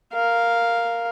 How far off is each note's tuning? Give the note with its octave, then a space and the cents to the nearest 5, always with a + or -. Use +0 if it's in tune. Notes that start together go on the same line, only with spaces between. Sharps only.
A#4 +0 F5 +0